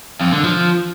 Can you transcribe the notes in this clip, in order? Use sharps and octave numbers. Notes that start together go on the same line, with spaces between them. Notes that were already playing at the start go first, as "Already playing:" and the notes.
F2
D3
F3